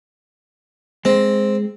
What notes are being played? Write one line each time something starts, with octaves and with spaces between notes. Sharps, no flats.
G#3 C4